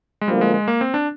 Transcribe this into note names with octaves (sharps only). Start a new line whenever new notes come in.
G#3
D2 D3 F3 G3 A#3
G#3
G#3
A#3
C4
D4